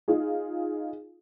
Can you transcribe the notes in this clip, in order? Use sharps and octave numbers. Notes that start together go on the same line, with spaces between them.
D#4 F4 G#4